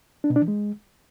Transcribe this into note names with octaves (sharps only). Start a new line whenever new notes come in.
D4
B2
D4
E3
G#3